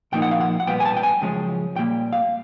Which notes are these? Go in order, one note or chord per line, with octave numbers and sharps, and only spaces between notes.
A#2 F3 A#3 D#4 G5
F#5
F5
F#5
F#5
A#2 G3 B3 G5
G#5
A5
G5
G#5
F#2 C#3 F3 G#3 C#4
A#2 G3 A#3 G5
F5